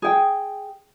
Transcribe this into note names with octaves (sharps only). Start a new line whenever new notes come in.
G#4 G5